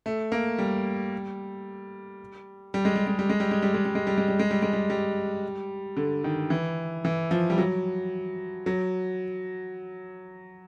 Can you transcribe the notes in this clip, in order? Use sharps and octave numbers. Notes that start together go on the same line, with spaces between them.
A3
A#3
G3
G3
G#3
G3
G#3
G3
G#3
G3
G#3
G3
G#3
G3
G#3
G3
G#3
G3
G#3
G3
G#3
G3
G3
D3
D#3
E3
E3
F3
G3
F#3
F#3